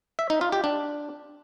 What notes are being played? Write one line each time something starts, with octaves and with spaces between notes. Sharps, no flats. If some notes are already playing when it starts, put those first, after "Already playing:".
E5
D#4
F4
G4
D4